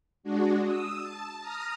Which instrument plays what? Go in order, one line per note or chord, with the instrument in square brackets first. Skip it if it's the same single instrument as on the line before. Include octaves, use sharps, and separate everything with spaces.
[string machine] G#3 D4 F#4
D#6 E6
A5
A#5 D#6 F6 A#6